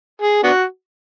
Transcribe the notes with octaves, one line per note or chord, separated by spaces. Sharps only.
G#4
B3 D4 F#4